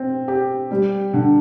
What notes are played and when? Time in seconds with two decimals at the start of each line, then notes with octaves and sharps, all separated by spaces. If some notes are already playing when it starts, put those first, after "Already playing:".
Already playing: C4
0.28 G4
0.71 G3
1.13 D3